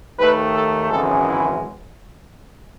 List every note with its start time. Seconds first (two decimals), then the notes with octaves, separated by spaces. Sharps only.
0.19 D#2 D#3 A3 B4
0.54 A4
0.90 G#1 F#2 C#3 E3 G#3 A4
1.25 E4